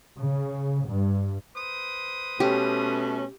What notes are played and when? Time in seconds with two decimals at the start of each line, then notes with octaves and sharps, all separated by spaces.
0.20 C#3
0.85 G2
1.56 B4 C5 D#6
2.40 B2 A3 C#4 G4